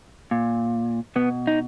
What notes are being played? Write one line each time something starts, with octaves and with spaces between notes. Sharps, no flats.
A#2
B2 B3
D#4